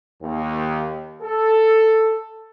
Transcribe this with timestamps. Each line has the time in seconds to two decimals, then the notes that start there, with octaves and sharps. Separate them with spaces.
0.22 D#2
1.23 A4